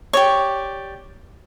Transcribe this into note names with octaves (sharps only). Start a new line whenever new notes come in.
G4 C#5 D5 C#6